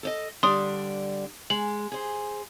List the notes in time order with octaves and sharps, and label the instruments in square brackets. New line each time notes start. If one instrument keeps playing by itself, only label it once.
[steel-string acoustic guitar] A4 D5 D#5
[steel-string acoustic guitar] D3 G3 D4 [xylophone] C6 D#6
[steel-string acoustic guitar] G#3 [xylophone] F#7
[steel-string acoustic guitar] G#4 C5